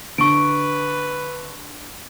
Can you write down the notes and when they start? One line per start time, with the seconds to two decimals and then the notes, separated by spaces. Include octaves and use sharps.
0.18 D3 B4 C#6 D7